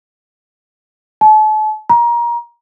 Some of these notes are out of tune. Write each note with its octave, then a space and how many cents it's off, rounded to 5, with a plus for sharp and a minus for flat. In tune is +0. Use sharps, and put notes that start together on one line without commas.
A5 -40
A#5 +25